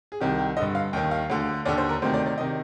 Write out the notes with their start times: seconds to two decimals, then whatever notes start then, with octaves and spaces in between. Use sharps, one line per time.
0.12 G#4
0.20 C2 C3 D#3 G4
0.39 G4
0.57 G2 D3 D#5
0.75 F5
0.93 D#2 G5
0.97 D#3
1.11 F5
1.30 D2 D3
1.65 D#2 D3 D5
1.78 C5
1.89 A#4
2.02 D2 C3 D#3 C5
2.14 D5
2.26 D5
2.38 C3 D#3 D#5